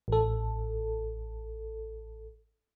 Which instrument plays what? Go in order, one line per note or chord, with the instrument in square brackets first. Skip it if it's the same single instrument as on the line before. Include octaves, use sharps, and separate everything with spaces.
[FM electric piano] A1 A4